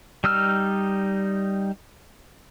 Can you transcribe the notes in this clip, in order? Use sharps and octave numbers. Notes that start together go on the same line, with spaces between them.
G3 D#4 E6 F6